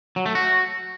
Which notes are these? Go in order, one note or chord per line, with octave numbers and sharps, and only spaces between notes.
F#3
A3
F#4